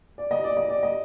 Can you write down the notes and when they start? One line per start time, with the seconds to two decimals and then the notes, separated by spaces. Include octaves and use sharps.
0.18 D5
0.31 D#5
0.44 D5
0.57 D#5
0.70 D5
0.83 D#5